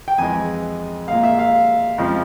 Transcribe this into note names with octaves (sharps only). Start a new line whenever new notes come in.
G5
F2 E3 G#3 G#5
A#2 G#3 F5
E5
F5
F2 C#3 F3 G#3